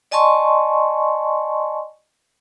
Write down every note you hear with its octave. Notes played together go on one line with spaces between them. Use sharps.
D5 D#5 G#5 A5 C6 C#6